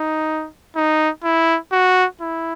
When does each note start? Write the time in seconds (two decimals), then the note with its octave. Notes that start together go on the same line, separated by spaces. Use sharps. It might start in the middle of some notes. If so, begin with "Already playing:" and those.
Already playing: D#4
0.76 D#4
1.24 E4
1.72 F#4
2.21 E4